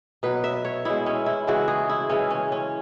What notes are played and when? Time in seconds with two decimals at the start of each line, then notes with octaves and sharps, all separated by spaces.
0.23 B2 F#3 B4
0.44 E5
0.65 C#5
0.85 B2 G#3 E4
1.06 C#4
1.26 E4
1.47 C#3 E3 G#3 F#4
1.68 G#4
1.89 E4
2.09 C#3 E3 G#3 C#4
2.31 C#4
2.52 C#4